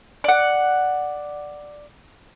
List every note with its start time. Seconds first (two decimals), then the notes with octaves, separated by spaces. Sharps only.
0.24 D5 F#5